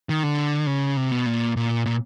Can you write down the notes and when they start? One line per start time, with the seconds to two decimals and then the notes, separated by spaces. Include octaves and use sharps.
0.09 D#3
0.23 D3
0.67 C#3
0.97 C3
1.11 B2
1.26 A#2
1.56 A#2
1.86 A#2